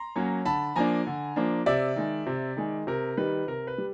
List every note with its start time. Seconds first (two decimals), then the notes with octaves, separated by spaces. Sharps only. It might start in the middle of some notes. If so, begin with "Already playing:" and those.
Already playing: A#5 C6
0.16 F#3 A#3 C#4
0.45 D3 A5 B5
0.76 F3 A#3 D4 G#5 A#5
1.07 D3
1.36 F3 A#3 D4
1.66 C3 D5 E5
1.96 D#3 G#3
2.26 C3
2.57 D#3 G#3
2.87 C3 A#4
3.17 D#3 G3 B4
3.47 C3 A#4
3.67 B4
3.78 G3